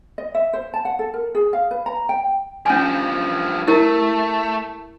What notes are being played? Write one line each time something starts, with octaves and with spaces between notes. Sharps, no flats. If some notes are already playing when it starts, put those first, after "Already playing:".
D#5
E5
C5
A5
F#5
A4
A#4
G#4
F5
B4
A#5
G5
G2 F3 C#4 G#5
A3 E4 G4 A#4